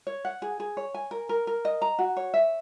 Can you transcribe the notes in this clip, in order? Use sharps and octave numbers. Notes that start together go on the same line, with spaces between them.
C#5
F#5
G#4
G#4
C#5
G#5
A#4
A#4
A#4
D#5
A#5
F#4
C#5
E5